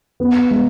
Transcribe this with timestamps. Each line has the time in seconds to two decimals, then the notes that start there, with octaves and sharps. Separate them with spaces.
0.20 B3
0.51 G#3